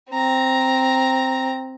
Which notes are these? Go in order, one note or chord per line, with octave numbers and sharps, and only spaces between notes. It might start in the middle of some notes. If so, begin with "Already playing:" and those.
C4 A#5